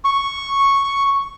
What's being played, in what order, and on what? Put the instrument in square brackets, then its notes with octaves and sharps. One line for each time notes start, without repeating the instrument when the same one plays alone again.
[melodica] C#6